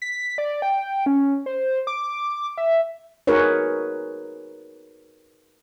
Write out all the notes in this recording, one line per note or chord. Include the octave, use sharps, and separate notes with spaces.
B6
D5
G5
C#4
C5
D6
E5
D#4 F#4 G#4 A#4 B4 C#5